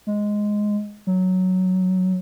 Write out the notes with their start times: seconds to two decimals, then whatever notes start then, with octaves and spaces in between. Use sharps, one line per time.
0.07 G#3
1.07 F#3